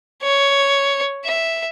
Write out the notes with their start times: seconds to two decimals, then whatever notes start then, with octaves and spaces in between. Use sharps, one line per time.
0.23 C#5
1.25 E5